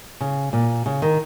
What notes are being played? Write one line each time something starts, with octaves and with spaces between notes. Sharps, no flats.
C#3
A#2
C#3
D#3